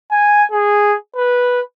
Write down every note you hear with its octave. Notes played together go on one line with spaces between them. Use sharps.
G#5
G#4
B4